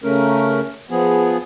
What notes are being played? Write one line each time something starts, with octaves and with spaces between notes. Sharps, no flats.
C#3 A3 C#4 A#4
F3 B3 G#4